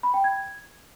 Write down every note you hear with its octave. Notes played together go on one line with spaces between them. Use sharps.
B5
G5
G#6